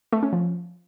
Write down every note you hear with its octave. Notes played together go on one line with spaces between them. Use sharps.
A3
C#4
F3